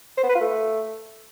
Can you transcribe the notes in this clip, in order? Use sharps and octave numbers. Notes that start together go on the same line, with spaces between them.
C5
B3
B4
F4
A3